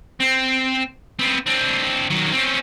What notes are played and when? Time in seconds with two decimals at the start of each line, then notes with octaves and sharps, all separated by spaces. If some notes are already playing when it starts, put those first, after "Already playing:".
0.20 C4
1.19 B3 C4
1.46 C4 D4
2.10 D#3 F#3
2.32 C4 C#4